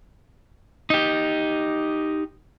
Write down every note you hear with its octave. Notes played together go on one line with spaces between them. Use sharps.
D#4 G4